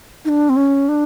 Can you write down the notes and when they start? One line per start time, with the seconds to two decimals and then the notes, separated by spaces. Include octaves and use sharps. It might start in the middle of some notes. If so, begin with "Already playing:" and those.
0.25 D#4
0.29 D4
0.49 C4
0.56 C#4
0.88 D4